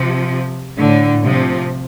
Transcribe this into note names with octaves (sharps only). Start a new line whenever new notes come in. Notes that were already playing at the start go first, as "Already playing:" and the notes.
Already playing: C3 F3
A2 D3
C3 F3